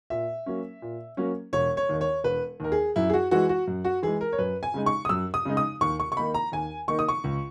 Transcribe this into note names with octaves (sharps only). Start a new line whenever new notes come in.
A#2 E5
F#3 A#3 C#4
A#2
F#3 A#3 C#4
E1 C#5
C#5
D#2 D#3
C#5
E1 B4
D#2 D#3 A#4
G#4
F#2 E4
G#4
F#4
E3 G#3 F#4
F#4
F#2
F#4
E3 G#3 G#4
A#4
C#5
F#2 B4
G#5
C#3 G#3 D#4
C#6
D#6
F#2 E6
D#6
C#3 G#3 D#4
D#6
D#2 C#6
C#6
C#6
D#3 A#3 D#4 B5
A#5
D#2 G#5
D#3 A#3 D#4 C#6
D#6
C#6
C#2